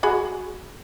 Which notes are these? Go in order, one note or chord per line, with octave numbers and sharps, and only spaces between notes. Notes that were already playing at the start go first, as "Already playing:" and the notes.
F#4 G#4 B5